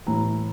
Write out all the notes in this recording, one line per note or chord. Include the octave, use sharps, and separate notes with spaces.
A2 E3 A#5